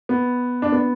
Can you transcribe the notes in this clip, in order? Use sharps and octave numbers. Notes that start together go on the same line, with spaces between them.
B3
D4
B3